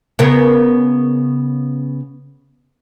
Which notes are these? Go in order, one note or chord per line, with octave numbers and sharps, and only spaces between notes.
C#3 B3 A#4